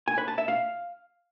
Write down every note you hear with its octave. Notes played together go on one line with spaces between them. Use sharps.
G#5
B4
A5
E5
F5